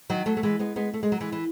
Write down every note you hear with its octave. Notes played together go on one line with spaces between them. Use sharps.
D#3 F#3
F#3 A3
A3
E3 G#3
G#3 B3
G#3 B3
A3
G#3
F#3
E3 G#3
E3